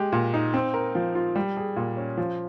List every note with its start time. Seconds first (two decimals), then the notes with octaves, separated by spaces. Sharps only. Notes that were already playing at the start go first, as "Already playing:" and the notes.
Already playing: G#3 G4
0.12 A#2
0.34 D#4
0.54 C4
0.74 A#4
0.95 F3
1.15 F4
1.36 G3
1.57 G#4
1.76 A#2
1.97 C#4
2.18 F3